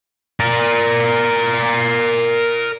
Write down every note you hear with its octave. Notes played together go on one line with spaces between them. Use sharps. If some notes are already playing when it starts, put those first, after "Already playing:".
A#4 D5